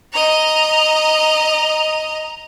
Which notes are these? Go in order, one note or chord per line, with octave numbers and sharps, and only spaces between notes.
D#5 A#5